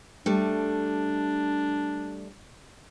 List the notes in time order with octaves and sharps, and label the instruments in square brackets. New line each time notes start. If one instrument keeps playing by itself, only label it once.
[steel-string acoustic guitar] G3 A3 [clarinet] D4